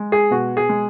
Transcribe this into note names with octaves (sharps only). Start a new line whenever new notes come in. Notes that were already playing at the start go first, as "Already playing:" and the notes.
Already playing: G#3
G#4
B2 F#4
G#4
G#3